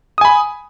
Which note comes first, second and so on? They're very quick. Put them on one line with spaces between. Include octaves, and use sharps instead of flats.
D#6 G#5 B5